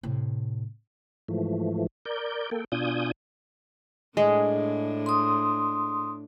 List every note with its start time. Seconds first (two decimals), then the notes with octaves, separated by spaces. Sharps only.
0.03 A2 C3
1.28 G#2 E3 F3 A3
2.05 A#4 D5 G6
2.51 A#3 A4 G5
2.72 B2 D4 F4 G#5 D#6 G6
4.17 A2 G#3 D4
5.06 C6 D#6